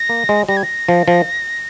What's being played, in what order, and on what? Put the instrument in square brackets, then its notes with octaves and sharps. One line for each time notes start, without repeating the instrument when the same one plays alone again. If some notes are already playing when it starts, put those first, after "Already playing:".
Already playing: [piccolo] A#6
[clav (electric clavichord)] A#3
G#3
[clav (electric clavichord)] G3 [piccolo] A#6
[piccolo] G#6
A#6
[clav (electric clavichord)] F3
F3